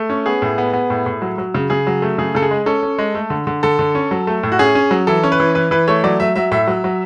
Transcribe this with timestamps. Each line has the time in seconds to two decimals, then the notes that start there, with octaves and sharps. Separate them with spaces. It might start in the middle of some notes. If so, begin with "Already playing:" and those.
Already playing: A3
0.10 C#4
0.26 B3 G#4
0.42 A2
0.58 B3
0.73 B3
0.90 A2
1.06 A2
1.22 F#3
1.38 F#3
1.55 C#3
1.70 C#3 G#4
1.87 F#3
2.02 A3
2.18 C#3 G#4
2.35 C#3 A4
2.42 G#4
2.51 G#3
2.66 C#4 A4
2.83 C#4
2.99 G#3
3.15 A3
3.30 D3
3.47 D3
3.63 D3 A4
3.79 D3
3.95 C#4
4.11 F#3
4.27 A3
4.43 A2
4.52 F#4
4.59 C#4 G#4
4.75 C#4
4.91 F#3
5.07 E3 A4
5.23 C#4
5.32 B4
5.40 E3
5.55 E3 B4
5.71 E3 B4
5.88 A3 C#5
6.04 F#3 D5
6.20 F#3 E5
6.36 F#3 E5
6.52 A2 E5
6.67 F#3
6.84 F#3